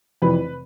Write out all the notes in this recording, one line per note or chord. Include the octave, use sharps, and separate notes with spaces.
F1 F2 E3 B4